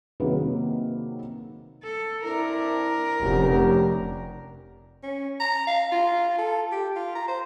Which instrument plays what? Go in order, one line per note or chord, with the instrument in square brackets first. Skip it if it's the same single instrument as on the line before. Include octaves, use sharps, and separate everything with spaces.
[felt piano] C3 D#3 F#3 A#3 G#4 B4
[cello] A4
[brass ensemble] C4 D4 E4 [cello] A#4
[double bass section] F1 [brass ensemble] C#4 D4 G4
[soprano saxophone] C#4
A#5
F5
F4
A4
G4
F4
A#5
C5